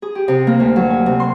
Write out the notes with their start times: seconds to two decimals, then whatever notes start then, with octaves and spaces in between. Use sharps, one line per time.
0.02 G#4
0.15 G4
0.28 C3
0.47 A#3
0.60 D2
0.76 F#3
0.90 G#5
1.06 C3
1.20 C6